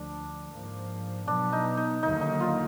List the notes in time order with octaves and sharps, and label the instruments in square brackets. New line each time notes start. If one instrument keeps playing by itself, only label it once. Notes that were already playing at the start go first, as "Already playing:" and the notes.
Already playing: [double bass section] D2 D3 F3 [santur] D4
[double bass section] G#2 F3 A#3
[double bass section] B2 F#3 B3 [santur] D4
[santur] D#4
D#4
[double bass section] D#2 D3 F#3 A#3 [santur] D#4
[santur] D#4
F4